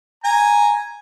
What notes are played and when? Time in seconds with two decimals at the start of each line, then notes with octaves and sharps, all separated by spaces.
0.24 G#5 A#5